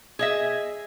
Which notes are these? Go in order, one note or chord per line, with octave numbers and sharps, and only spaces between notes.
G#4 D#5 E5